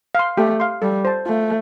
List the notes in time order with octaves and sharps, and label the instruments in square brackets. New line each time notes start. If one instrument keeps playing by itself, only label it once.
[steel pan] F5 C6
[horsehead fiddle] A3 [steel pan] G4
[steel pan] F5 C6
[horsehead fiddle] G3 [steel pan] A4
[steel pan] C5 A5
[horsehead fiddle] A3 [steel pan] F4